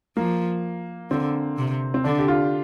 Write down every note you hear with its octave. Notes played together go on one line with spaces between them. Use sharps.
F3 A#3
D3 C4
C3
C4
D3 D4
G4
F4